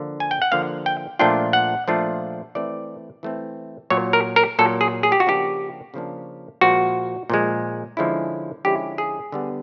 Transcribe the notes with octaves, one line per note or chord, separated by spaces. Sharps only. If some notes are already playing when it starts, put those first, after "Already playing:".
Already playing: D3 F3 A#3
G#5
G5
F#5
D3 F3 A#3 F5
G5
A#2 F3 A3 D4 F4 G5
F#5
A#2 F3 A3 D4 F4
E3 A3 C4 D5
E3 A3 C4
A#2 F#3 A#3 C#5
A#4
A#4
A#2 F#3 A#3 A4
G#4
G#4
G4
F#4
C#3 F3 A#3 D4 G4
C#3 F3 A#3 D4
A#2 F3 G#3 F#4
A#2 F3 G#3
D3 F3 G#3 C#4 E4
D3 F3 G#3 C#4 E4 G4
G#4
D3 G3 B3